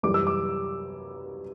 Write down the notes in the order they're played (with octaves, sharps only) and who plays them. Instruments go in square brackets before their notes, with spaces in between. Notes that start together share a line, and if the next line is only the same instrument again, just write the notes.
[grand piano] F#2 E3 G3 D6
E6
D6